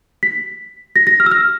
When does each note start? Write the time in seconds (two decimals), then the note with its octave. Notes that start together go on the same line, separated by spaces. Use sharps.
0.23 B6
0.96 A#6
1.07 A#6
1.20 F6
1.26 E6
1.31 F6